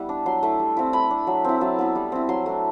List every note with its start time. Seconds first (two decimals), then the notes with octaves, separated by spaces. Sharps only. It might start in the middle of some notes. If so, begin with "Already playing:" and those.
Already playing: G3 B3 E4
0.09 D4
0.26 F#3 C6
0.43 A3 E4
0.60 G3
0.77 C4 E4
0.93 A3 B5
1.10 D4
1.27 F#3
1.44 C4 E4
1.61 F#3 A5
1.79 B3 E4
1.95 G3
2.12 C4 E4
2.29 F#3 C6
2.46 A3 D4